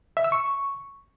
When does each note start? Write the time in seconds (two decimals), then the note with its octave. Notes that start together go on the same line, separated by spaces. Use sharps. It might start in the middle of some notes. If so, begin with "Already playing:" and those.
0.17 E5
0.24 E6
0.32 C#6